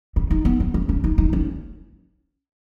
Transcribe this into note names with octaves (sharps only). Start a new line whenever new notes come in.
C#4
D#4
B3
C#4
C#4
C#4
D#4
D#4
C#4